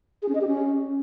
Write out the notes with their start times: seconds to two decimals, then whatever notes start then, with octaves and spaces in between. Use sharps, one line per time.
0.22 G#4
0.29 C#4
0.35 D#5
0.41 G4
0.48 C#4